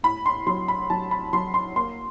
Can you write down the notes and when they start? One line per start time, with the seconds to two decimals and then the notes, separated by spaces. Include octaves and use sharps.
0.03 A2 B5
0.26 C6
0.47 F#3 C6
0.68 B5
0.90 F#3 A5
1.11 B5
1.33 F#3 C6
1.54 C6
1.76 A#3 C6